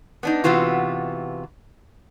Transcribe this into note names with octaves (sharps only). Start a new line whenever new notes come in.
B3 D4 D#4
C3 E3 B3 F4 F#4